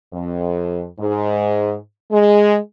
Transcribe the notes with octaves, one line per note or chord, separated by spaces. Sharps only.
F2
G#2
G#3